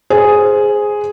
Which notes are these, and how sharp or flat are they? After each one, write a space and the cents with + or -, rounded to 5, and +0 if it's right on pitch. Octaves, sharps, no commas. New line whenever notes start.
G#4 +0 C5 +0